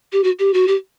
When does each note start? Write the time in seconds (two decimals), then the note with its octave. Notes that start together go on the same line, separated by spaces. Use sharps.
0.13 G4
0.24 F#4
0.39 G4
0.54 F#4
0.68 G4